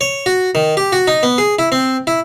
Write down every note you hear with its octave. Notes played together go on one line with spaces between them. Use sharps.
C#5
F#4
D#3
G4
F#4
D#4
B3
G#4
E4
C4
E4